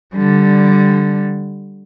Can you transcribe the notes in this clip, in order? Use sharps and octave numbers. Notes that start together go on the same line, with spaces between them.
D3 G3